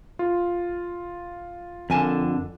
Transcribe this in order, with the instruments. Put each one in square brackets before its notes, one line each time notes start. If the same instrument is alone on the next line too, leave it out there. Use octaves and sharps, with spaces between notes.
[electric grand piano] F4
[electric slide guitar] F2 D3 [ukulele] A#4 G#5 A5